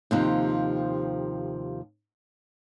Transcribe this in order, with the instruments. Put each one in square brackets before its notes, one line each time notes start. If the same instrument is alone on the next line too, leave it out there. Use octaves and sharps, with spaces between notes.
[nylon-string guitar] D#2 C3 F3